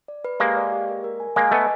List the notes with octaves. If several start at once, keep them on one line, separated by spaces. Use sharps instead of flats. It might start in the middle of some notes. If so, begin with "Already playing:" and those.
D5
B4
G#3 A#3 G4
D5
G4
A#4
A#4
G#5
G#3 A#3 G#5
A3 B3 D#5